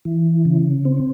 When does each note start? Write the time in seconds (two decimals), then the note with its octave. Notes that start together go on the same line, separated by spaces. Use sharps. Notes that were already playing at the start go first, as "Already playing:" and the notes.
0.05 E3
0.45 C#3
0.85 C4